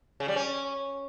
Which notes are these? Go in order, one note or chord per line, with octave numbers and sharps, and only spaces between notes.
C#3
G3
C#4